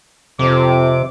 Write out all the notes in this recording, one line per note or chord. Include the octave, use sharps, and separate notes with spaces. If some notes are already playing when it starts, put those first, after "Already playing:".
F2 C3 D6